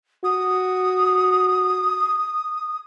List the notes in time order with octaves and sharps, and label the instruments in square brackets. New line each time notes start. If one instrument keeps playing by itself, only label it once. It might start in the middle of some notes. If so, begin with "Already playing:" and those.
[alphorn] F#4 [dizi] D#6